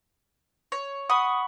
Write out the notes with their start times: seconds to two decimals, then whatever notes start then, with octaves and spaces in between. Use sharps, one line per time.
0.72 C#5
1.10 F#5 B5 C#6 D#6